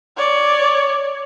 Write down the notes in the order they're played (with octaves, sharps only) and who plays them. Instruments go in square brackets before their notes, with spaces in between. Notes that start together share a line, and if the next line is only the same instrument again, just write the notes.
[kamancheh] C#5 D5